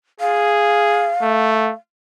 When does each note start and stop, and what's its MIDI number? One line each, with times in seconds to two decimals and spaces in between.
0.20 1.14 68
0.20 1.72 77
1.22 1.72 57